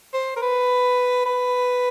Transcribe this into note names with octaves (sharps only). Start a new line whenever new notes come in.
C5
A#4
B4
B4